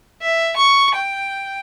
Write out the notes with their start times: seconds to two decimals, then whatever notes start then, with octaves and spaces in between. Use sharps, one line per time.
0.22 E5
0.56 C#6
0.95 G5